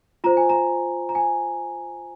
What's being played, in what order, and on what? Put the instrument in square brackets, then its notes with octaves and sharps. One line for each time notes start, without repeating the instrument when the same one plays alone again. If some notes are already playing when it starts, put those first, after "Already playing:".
[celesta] F4 C5 A#5
G#5
A#5
A#5
G#5